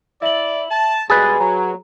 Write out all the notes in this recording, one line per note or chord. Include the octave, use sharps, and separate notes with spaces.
E4 D5 E5 F#7
A5
B2 G3 G#3 G#4 B4 A6
F#3 A#5